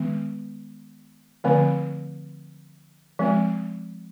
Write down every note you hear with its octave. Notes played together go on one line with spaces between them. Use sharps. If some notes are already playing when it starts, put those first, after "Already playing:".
Already playing: D#3 G#3 B3
D3 F3 A3 C4
F3 G#3 C4